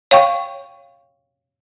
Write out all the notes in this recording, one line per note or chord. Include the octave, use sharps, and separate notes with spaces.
C#5 F5 G5 C#6